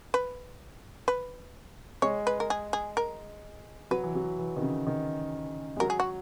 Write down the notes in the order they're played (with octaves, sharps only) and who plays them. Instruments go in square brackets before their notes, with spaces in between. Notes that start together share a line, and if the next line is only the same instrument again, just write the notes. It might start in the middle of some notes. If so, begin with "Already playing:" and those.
[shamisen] B4
B4
[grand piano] G#3 [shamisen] C#5
[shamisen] B4
A#4
G#4
G#4
A#4
[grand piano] F#3 [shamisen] B4
[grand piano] E3
F#3
E3
D#3
C#3
D#3
G#3
[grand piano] F#3 [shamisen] A#4
[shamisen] G#4
F#4